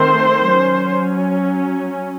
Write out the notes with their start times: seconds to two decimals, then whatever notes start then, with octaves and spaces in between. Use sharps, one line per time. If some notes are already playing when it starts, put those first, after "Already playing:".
Already playing: D#3 A3 C4 C5
0.53 F#3 C#4